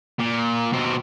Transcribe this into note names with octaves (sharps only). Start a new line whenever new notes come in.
A#2
B2 C4